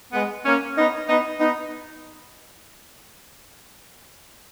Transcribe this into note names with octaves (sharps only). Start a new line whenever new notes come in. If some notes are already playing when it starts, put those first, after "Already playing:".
G#3 B3
A#3 C#4
B3 D#4
B3 D#4
B3 D#4